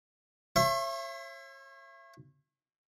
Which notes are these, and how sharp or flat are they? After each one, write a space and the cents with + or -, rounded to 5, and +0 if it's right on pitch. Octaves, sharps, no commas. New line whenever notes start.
C#5 -35 E5 +30 C6 +35